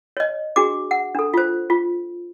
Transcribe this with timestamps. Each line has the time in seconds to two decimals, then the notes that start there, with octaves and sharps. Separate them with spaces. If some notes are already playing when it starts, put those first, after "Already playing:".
0.17 C#5 D#5
0.56 D4 F#4 G#4 D6
0.91 F#5
1.15 D4 A4
1.34 F4 C5
1.70 F4